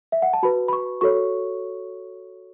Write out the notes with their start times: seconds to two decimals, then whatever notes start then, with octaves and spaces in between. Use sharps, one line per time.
0.12 E5
0.22 F#5
0.33 A5
0.43 F#4 B4 B5
0.68 B5
0.73 C#6
1.01 F#4 A4 C#5 C#6